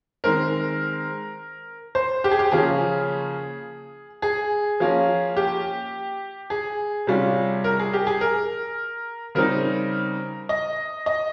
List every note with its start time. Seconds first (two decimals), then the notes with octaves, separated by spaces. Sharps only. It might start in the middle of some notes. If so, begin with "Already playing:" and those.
0.24 D#3 G#3 C4 A#4
1.95 C5
2.24 G4
2.31 G#4
2.39 G4
2.52 C#3 F3 A#3 C#4 F4 G#4
4.22 G#4
4.80 F3 A#3 C#4 F4
5.37 G4
6.50 G#4
7.07 C3 G3 C#4 F4
7.64 A#4
7.79 G#4
7.93 G4
8.07 G#4
8.21 A#4
9.35 C#3 G3 C4 D#4 A#4
10.49 D#5
11.06 D#5